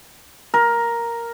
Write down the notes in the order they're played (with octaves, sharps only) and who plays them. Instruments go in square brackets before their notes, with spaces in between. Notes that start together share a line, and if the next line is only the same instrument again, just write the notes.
[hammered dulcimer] A#4